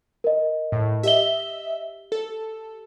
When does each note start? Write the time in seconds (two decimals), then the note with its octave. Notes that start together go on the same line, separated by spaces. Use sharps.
0.24 A#4 D#5
0.72 A2
1.03 G4 D#5 E5 G7
2.12 A4